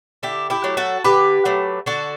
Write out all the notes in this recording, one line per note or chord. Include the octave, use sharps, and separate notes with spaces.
D3 E4 G4
E4 G4
F#3 A3
F#4 A4
D3 G4 B4
F#3 A3
D3 F#4 A4